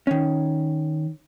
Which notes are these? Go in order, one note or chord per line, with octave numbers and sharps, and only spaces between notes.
D#3 C#4